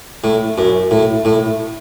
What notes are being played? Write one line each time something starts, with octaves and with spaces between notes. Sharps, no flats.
A2
F#2
A2
A2